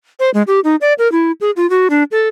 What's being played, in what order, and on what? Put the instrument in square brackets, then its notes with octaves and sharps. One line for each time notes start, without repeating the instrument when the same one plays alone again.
[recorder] C5
G#3
G4
D#4
D5
A#4
E4
G#4
F4
F#4
D4
A4